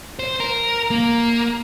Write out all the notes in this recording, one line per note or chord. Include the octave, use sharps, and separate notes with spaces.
C5
A#4
A#3